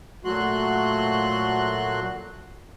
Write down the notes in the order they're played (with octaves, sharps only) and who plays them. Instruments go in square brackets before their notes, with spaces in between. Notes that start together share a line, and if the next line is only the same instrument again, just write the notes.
[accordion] A#2 F#3 A3 F#4 C6 F#6